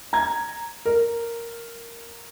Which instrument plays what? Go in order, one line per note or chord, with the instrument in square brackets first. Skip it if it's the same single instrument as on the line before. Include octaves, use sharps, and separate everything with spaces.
[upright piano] A#5 G#6
A#4